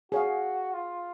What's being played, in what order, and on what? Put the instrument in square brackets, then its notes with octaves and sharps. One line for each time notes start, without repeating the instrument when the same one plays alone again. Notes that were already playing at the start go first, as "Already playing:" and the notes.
[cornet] F#4 [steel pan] G#4 C#5 F5
[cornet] F4